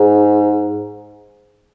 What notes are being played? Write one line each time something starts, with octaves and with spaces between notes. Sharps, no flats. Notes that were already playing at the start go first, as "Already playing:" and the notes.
Already playing: G#2